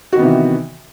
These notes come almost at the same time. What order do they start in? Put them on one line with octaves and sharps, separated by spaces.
F#4 D#3 B3 C3 E3